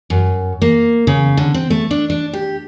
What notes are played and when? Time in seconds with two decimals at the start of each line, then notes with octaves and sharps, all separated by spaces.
0.10 F#2
0.62 A#3
1.07 C#3
1.37 D3
1.54 C4
1.70 A3
1.91 D4
2.10 D4
2.33 G4